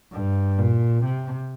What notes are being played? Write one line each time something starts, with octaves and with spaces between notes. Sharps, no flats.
G2
A#2
C3